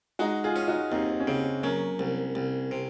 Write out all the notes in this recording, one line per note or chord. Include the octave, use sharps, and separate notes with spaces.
G#3 D#4 F#4
F4 G#4
C#4
D#4 F#4
D#2 C4 D#4
C#4
C#3 C4
F#3 A#3 C#4
C2
C2
C3